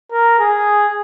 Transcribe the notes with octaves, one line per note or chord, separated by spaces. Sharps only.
A#4
G#4